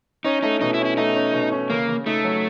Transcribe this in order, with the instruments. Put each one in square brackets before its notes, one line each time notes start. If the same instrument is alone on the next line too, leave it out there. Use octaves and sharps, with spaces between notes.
[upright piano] C#4 [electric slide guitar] D#4
[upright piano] A3 [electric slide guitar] D#4
[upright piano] B2 [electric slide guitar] D#4
[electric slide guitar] E4
[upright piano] C#4
[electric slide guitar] E4
[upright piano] A3 [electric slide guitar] D#4
[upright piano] C#4
B2
C#4
[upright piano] C#3 [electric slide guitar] A#3
[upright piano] C#3
[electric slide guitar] A3 [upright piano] D#4
[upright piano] F#3